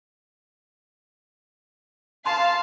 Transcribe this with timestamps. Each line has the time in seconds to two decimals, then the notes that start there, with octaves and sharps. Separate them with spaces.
2.26 F5 A5 C6